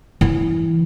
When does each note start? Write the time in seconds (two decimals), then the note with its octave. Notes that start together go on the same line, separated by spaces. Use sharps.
0.21 E3